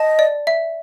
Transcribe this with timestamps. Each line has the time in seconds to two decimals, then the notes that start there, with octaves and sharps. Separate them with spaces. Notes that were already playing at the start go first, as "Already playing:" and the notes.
Already playing: D#5 A5
0.19 D5
0.47 E5